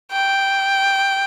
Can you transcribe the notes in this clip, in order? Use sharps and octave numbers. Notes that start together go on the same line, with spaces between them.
G5